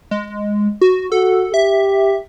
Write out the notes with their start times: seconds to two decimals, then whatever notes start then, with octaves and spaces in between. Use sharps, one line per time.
0.11 G#3
0.81 F#4
1.12 F#4 A4
1.54 G4 E5